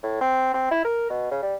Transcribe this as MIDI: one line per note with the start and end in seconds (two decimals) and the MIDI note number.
0.03 0.21 45
0.21 0.51 60
0.54 0.69 60
0.71 0.84 64
0.85 1.05 70
1.10 1.29 47
1.31 1.39 49
1.42 1.55 55